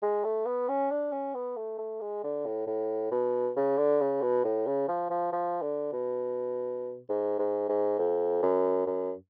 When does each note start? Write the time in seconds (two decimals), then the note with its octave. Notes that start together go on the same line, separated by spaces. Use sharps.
0.03 G#3
0.24 A3
0.46 B3
0.69 C#4
0.91 D4
1.12 C#4
1.35 B3
1.57 A3
1.79 A3
2.01 G#3
2.24 D3
2.46 A2
2.67 A2
3.11 B2
3.57 C#3
3.78 D3
4.01 C#3
4.22 B2
4.44 A2
4.67 C#3
4.89 F3
5.11 F3
5.33 F3
5.62 D3
5.93 B2
7.09 G#2
7.39 G#2
7.69 G#2
7.99 F2
8.43 F#2
8.87 F#2